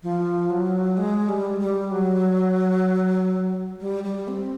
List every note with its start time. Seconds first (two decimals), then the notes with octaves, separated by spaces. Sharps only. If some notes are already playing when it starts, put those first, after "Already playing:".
0.03 F3
0.50 F#3
0.97 G#3
1.29 G3
1.60 G3
1.92 F#3
3.81 G3
4.04 G3
4.28 C4